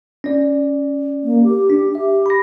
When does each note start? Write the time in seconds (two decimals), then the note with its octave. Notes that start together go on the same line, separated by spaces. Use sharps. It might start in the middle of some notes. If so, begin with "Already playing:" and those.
0.24 C#4 D5
1.24 A#3
1.44 G4
1.70 D4
1.95 G4 E5
2.26 B5 A#6